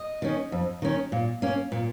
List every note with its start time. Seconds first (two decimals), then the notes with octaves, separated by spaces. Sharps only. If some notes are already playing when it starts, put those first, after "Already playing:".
Already playing: D#5
0.22 D#3 C#4
0.52 F2
0.82 D#3 C#4
1.12 A#2
1.42 A#3 C#4
1.72 A#2